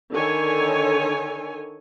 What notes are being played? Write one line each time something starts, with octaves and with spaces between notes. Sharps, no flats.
D3 D#3 A4 C#5 G#5